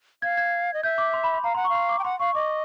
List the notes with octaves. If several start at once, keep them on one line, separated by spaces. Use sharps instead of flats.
F5 G#6
G#6
D#5
E5 G6
D6
C6
B5
C6
F5 A#5
F#5 C6
C#6
F5 C6
D6
G5
F#5 C6
F5 C#6
D#5 D6